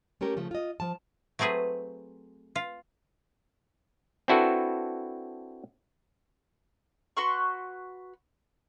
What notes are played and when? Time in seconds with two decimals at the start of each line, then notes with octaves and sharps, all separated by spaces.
0.21 A3 C#4 G4 A#4
0.37 C#3 F3 A3
0.51 F4 D#5
0.80 F3 A5
1.39 F#3 A3 C4 G#4 B4
2.55 F4
4.28 C4 D4 E4 F#4 A4 B4
7.17 F#4 B4 C6 C#6